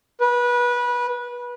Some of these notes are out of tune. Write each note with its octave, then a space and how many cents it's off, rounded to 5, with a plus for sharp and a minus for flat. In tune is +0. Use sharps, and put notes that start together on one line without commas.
B4 -25